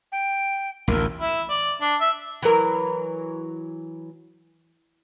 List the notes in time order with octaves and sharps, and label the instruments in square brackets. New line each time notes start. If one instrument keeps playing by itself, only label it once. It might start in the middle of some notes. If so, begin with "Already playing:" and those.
[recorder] G5
[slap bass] A1 D2 [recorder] A#4
[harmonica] E4
D5
D4
E5
[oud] E3 F#3 A#4